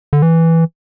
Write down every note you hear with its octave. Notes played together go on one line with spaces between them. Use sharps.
D3
E3